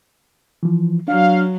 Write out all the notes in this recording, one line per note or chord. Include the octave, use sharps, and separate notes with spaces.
E3 F3
F#3 D4 F5